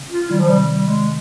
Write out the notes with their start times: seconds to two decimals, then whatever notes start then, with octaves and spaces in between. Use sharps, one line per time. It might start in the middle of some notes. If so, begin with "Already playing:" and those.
Already playing: C#3
0.11 F4
0.30 D#3 G3
0.40 F3
0.49 C3 G3
0.68 G3
0.87 G#3